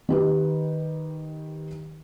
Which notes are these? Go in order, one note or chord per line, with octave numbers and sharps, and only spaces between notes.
D#3 G4 B4